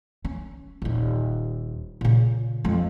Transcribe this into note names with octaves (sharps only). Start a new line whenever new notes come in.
C#4
D#1 D#4
A#2 C#3
F2 G#3